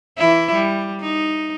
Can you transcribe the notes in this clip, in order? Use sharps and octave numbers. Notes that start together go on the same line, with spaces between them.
E3 E4
G3
D#4